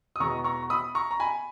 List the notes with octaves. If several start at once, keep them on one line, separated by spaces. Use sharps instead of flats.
D#6
E2 B2 G#3 B3 A#5 C#6
A#5 C#6
B5 D#6
A#5 C#6
A#5
G#5 B5